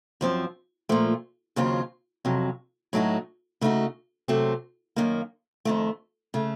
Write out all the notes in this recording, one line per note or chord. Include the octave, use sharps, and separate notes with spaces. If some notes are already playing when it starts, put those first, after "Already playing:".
F#2 F3 C4
A#2 F3 A3
D#2 C#3 F#3 C4 F4
F2 C3 F#3
A2 F#3 A3 D#4 F#4
C#3 A3 D#4 F#4
C3 F#3 A3 C4
F#2 D#3 A#3
F2 D#3 A3
C#3 A3